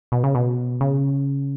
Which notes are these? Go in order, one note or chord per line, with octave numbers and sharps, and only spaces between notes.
B2
C#3
B2
C#3